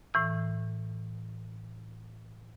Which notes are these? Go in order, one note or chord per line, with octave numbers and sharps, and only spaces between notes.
A2 E3 E6